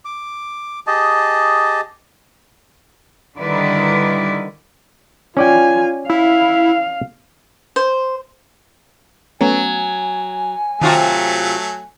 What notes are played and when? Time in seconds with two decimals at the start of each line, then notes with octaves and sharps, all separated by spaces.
0.05 D6
0.87 G4 G#4 D#5 A5
3.36 D3 D#3 G3 E4 B4 D5
5.37 C#4 F4 D5 G5 G#5
6.10 E4 F5
7.76 C5
9.41 F#3 A3 B3 C#4 G#5
10.81 C3 D#3 F#3 A3 F4 F#4 C7